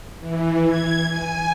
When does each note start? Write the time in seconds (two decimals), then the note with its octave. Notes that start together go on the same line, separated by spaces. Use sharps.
0.20 E3
0.65 G#6
1.09 G#5